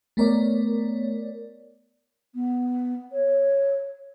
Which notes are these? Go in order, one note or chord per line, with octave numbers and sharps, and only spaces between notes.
A3 B3 A#4 C#5 D5
B3
C#5